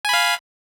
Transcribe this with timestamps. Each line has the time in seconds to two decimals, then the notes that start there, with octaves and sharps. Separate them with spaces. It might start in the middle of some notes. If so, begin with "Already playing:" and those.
0.05 G#5
0.09 B5
0.13 F5